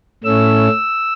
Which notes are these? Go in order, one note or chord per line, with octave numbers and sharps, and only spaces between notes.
A2 A3 C#4 E6